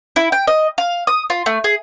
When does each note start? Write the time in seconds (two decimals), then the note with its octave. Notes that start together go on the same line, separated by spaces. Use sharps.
0.16 E4
0.32 G5
0.47 D#5
0.78 F5
1.07 D#6
1.30 F4
1.46 A3
1.64 G#4